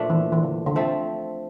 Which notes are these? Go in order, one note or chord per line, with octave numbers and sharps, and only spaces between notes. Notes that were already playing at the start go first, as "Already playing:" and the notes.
Already playing: A#2 F3 A3 D4
E3
E3
D3
D3
F3 A3 C4